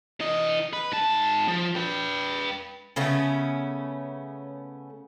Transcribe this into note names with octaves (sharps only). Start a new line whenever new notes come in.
E3 D#5
B4
G#2 A5
F3
B4 G5
C#3 A3 B3 C#4